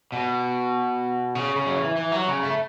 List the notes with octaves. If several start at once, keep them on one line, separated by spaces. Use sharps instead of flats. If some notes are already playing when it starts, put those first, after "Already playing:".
B2
C#3
C#3
F#3
E3
E3
F#3
C#3
A3